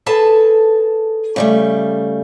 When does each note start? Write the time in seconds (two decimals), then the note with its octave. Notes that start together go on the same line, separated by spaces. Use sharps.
0.06 G#4 A4 B4 A5
1.36 C#3 G3 A3